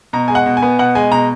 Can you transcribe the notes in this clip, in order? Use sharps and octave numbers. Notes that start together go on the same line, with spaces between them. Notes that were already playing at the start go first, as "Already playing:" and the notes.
B2 A#5
G#3 G#5
F#5
B2
G#5
B3
B2 F#5
G#3 G#5
B2 A#5